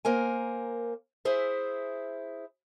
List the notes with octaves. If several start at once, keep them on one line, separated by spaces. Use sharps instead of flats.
A#3 A#4 C5 G#5
E4 G#4 C5 E5